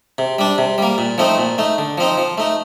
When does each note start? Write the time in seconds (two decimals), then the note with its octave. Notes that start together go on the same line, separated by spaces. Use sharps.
0.18 C3
0.39 G3 D4
0.58 C3
0.78 G3 A#3
0.98 A#2
1.18 F3 A3 C4 D#4
1.38 A#2
1.58 A3 D#4
1.78 D3
1.98 F3 C4 D#4
2.17 F3
2.38 A3 D#4